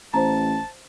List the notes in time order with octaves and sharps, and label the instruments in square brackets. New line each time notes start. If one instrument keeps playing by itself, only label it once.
[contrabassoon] A1 [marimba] C5 A#5 [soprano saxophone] A5